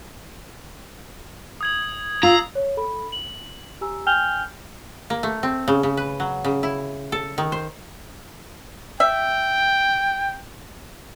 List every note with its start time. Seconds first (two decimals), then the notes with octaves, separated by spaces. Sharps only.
1.61 D#6 G#6 F#7
2.23 F4 A#5 E6 C7 F#7
2.55 C#5
2.77 A4 B5
3.12 F#7
3.81 G4 G#5 A#5 E6
4.06 G5 G#5 F6 G6 F7 G7
5.10 A#3
5.23 A3
5.43 C4
5.68 C#3
5.83 C#3
5.97 B4
6.20 F#3
6.45 C#3
6.63 E4
7.12 A4
7.38 D#3
7.52 C5
9.00 E5 G5